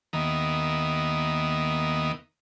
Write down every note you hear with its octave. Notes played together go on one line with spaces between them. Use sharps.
D#2 D#3 A#3 B3 E5 D#6